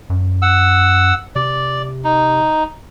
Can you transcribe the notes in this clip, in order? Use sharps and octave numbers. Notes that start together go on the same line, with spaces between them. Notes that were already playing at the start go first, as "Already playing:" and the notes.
F#2
F#5 E6
C3 D5
D#4